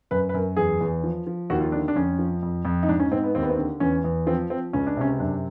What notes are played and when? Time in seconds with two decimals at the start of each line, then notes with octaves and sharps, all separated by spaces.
0.11 F#2 B4
0.29 B4
0.34 F#2 A#4
0.57 E2 G#4
0.81 E2
1.04 F3
1.27 F3
1.50 D#2 F#4
1.61 F4
1.72 D3 D4
1.88 D4
1.95 F2 C#4
2.19 F3
2.42 F2
2.65 F2
2.83 D#4
2.88 G#2 D4
3.00 C#4
3.12 G#2 C4
3.24 B3
3.35 D#2 C4
3.43 B3
3.50 C4
3.58 D3
3.80 E2 C#4
4.04 E2
4.27 F3 C4
4.50 F3 C4
4.73 C#2 C#4
4.87 D4
4.97 C3 C#4
5.20 F#2 D4